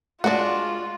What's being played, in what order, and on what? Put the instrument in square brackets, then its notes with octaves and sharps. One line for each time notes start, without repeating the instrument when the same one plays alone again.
[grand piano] G#3 [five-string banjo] D4 F#4 [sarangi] F4 [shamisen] D5 F#5